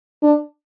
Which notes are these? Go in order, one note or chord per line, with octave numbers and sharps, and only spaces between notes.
D4